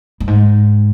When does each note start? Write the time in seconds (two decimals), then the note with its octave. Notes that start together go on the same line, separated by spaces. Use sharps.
0.20 G2
0.27 G#2